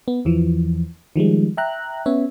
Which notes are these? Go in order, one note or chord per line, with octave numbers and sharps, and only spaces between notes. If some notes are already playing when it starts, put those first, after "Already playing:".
B3
E2 E3 F3
D#3 F3 G3 G#3
E5 G5 A#5 F#6
B3 C#4 C#5 E5